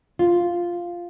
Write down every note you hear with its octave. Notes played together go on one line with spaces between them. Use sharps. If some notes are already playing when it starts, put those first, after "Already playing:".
F4